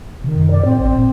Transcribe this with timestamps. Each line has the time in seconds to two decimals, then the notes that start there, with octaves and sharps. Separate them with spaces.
0.24 C3 D#3
0.37 F#2
0.50 D5
0.65 A2 C4
0.80 A1 C4
0.96 A#2